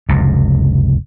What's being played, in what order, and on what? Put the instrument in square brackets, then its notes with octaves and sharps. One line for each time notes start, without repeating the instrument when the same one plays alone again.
[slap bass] F1 C#2 F#2